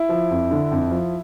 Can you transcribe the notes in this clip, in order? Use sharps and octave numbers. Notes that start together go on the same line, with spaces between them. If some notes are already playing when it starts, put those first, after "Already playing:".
Already playing: E4
F3
F2
D3
F2
F3